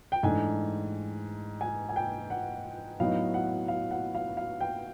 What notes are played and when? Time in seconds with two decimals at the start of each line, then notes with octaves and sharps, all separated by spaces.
0.12 G5
0.23 G#2 E3 A3 D4 G#5
1.61 G#5
1.89 G#5
1.96 G5
2.30 F#5
3.00 A2 F#3 B3 D#4 F5
3.34 F#5
3.68 F5
3.91 F#5
4.15 F5
4.37 F5
4.61 G5